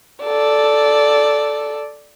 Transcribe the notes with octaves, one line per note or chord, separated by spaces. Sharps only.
A4 D5